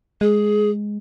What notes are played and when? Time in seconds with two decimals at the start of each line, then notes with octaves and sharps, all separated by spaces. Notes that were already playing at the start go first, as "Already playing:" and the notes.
0.21 G#3 G#4